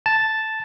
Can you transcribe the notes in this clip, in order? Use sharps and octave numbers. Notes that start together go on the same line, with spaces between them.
A5